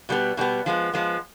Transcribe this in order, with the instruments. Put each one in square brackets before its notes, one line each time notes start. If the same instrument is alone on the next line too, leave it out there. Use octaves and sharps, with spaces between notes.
[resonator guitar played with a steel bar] B2 G3 B3
B2 G3 B3
F3 G#3 B3
F3 G#3 B3